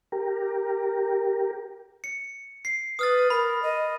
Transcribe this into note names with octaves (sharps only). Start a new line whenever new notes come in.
G4 A#4
C#7
C7
B4 D#6 F6 A6
A#4 B5
D#5